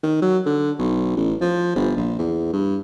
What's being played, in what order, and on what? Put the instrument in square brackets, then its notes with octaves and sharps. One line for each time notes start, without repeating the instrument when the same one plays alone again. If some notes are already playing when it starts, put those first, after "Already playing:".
[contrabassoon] D#3
F#3
D3
B1
A1
F3
G1
A#1
E2
G2